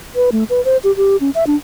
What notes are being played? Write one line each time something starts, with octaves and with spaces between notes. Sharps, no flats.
B4
A3
B4
C5
G4
G4
C#4
E5
D4